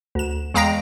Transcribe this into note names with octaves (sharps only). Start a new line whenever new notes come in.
D2 E7
E2 G#3 F5 G5 A#5 A#6